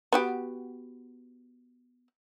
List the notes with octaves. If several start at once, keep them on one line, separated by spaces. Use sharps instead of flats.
B3 F#4 G4